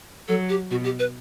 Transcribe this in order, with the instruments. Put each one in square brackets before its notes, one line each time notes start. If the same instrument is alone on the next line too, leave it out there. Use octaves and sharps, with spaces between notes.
[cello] F#3 [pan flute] A4
[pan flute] G4
[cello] B2 [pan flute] F#4
[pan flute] G4
B4